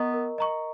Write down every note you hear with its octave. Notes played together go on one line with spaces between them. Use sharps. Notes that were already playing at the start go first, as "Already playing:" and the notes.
Already playing: B3 A#4 D#5 A#5 C#6
A#4
D#5 A#5 C#6